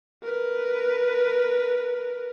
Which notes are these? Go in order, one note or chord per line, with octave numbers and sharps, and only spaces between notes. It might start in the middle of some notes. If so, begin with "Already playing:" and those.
A#4 B4